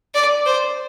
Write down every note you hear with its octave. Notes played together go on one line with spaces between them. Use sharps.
D5
C5